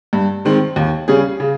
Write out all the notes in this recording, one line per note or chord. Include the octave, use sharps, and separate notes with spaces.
G2
D#3 G#3 C4
D#2
C#3 G3 C#4 G#4
C#3